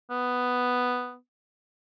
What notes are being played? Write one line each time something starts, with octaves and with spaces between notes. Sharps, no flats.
B3